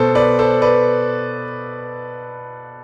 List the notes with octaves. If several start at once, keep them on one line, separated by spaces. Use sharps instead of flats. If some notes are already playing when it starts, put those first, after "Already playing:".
Already playing: B2 A4 C5
B4 D5
A4 C5
B4 D5